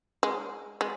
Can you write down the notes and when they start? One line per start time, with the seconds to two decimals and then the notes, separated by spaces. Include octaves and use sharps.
0.23 G#3
0.81 G#3